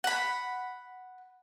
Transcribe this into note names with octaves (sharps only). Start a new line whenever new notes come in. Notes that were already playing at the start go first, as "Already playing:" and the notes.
F#5 B5